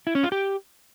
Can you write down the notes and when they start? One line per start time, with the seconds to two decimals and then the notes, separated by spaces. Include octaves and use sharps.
0.07 E4
0.15 C#4
0.23 F4
0.32 G4